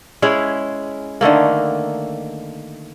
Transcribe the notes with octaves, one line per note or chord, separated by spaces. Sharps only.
G#3 C#4 E4 G#4
D3 D#3 A3 A#3